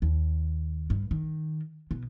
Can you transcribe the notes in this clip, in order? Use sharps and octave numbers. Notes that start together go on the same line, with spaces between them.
D#2
G2
D#3
B2